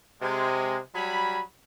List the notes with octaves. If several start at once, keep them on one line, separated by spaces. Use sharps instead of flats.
C3 G#3
F#3 G3 G#5 B5